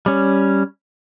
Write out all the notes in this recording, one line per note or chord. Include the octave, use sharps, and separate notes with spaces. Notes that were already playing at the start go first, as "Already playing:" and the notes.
G3 C#4